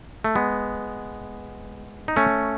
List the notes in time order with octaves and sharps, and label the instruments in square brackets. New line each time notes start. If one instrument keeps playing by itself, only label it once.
[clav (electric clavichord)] A3
G#3 B3
D#4
A3 C#4